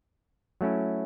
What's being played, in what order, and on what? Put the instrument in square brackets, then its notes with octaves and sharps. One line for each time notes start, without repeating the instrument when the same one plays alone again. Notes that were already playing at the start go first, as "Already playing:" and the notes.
[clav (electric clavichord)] F#3 A3 C#4 E4